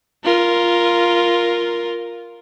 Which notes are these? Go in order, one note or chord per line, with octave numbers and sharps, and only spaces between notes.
F4 A#4